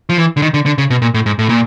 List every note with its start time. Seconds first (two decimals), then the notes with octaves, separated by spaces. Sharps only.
0.09 F3
0.17 E3
0.37 D3
0.42 D#3
0.54 D3
0.66 D3
0.78 C#3
0.90 B2
1.02 A#2
1.14 A2
1.26 G#2
1.39 A2
1.49 A#2